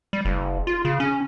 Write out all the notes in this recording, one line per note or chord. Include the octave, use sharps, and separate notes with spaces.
G3
F#1
F4
C#3
C#4